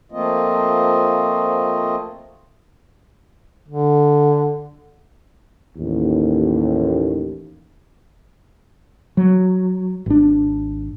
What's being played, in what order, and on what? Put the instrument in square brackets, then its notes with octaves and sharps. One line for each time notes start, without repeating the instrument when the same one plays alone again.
[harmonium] F3 A3 A#3 C4 F4 D#5
[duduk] D3
[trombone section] A1 D#2
[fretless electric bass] F#3
G#1 D4